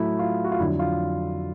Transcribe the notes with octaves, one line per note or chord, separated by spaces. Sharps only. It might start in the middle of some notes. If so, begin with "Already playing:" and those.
Already playing: A2 F#3 A3 E4
F4
F#4
F4
F2 D3 F#3 E4
F4